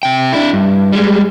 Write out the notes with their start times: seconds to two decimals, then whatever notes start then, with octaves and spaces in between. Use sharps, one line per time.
0.03 C3 G5
0.33 D4 E4
0.53 G2
0.93 G3 G#3